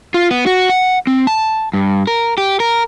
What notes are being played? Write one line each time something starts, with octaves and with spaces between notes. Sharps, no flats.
F4
B3
F#4
F#5
C4
A5
G2
A#4
G4
A#4